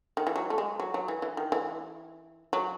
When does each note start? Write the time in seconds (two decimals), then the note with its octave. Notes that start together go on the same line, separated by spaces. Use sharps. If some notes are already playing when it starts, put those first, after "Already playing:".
0.17 D#3
0.27 E3
0.36 F#3
0.50 A3
0.58 G#3
0.80 F#3
0.94 F#3
1.08 E3
1.22 E3
1.37 D#3
1.52 E3
2.53 F#3